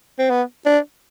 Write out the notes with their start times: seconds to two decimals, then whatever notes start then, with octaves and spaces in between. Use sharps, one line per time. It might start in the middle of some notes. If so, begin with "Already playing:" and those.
0.19 C4
0.30 B3
0.66 D4